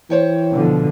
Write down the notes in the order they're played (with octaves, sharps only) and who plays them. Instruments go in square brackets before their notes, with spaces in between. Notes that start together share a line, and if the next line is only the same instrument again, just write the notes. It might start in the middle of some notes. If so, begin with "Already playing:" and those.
[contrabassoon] E3 [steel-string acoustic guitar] C5 C#5 G5
[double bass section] B2 D3 F3